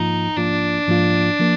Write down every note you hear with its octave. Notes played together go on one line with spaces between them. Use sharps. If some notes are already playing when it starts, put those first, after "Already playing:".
Already playing: G#2 F3 A#3 D#4 F4
G#2 F3 A#3 D4 F4
G#2 F3 A#3 F4
F3 A#3